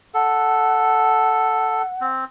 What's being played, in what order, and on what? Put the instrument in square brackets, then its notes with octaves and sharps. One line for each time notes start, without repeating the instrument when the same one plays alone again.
[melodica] A4 [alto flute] F#5
[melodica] C4